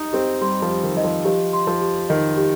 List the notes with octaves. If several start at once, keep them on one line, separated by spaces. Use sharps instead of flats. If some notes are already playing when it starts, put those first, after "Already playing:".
Already playing: D#4 G4 D#5
C4 G4
G3 C6
F3
G4
D#3
D#3 D#5
F3
F3 G4
C6
F3
G4
D#3 D#5
G4